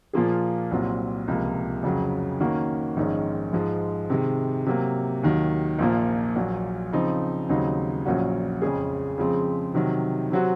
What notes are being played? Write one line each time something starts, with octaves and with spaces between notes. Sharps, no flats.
A#2 F3 A#3 F4 G#4
C2 A#2 F#3 C4
C#2 C3 F3 A#3
F2 C#3 F#3
D#3 A#3 C#4 F#4
A#1 G#2 D#3 G#3 C#4
G#2 F3 G#3
C3 D#3 G#3
C3 F#3 A#3
D#2 D#3 F#3
A#1 A#2 F3 A#3
A#1 A#2 F#3
C#3 F3 C4 D#4
D#2 C#3 F#3 C4 D#4
A#1 A#2 F#3 C#4 F#4
F2 C#3 G#3 C#4 G#4
C#3 F3 G#3 C4
C3 D#3 F#3
C3 F#3 C4 F#4